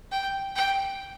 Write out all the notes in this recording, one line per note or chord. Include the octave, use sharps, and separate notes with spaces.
G5
G5